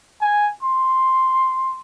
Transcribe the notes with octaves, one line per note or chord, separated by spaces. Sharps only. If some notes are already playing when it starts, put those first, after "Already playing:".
G#5
C6